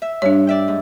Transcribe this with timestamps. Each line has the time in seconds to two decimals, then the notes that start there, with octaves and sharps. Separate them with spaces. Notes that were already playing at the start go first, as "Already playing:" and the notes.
0.02 E5
0.22 G2 D4 C#5
0.47 D5 E5 G5
0.68 G#2